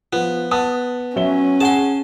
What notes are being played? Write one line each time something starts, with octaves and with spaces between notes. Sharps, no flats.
F3 B3
B3 A5 D#6
F#3 C#4 E5 G7
G#4 F#5 A5 C6